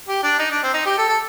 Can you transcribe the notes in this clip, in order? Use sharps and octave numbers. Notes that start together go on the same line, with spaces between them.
G4
D4
D#4
D4
C4
D#4
G4
A4
A4